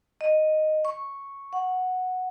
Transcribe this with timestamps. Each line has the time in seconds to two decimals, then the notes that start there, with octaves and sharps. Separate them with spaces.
0.21 D#5
0.85 C#6
1.53 F#5